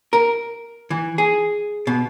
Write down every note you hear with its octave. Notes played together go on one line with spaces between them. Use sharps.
A#4
E3
G#4
B2